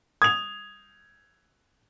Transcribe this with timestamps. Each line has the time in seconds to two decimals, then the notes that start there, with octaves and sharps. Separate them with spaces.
0.22 D#6 G#6 F7